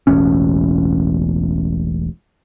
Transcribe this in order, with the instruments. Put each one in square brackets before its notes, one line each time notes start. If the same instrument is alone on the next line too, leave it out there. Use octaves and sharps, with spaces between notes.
[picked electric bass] E1 A1 C#4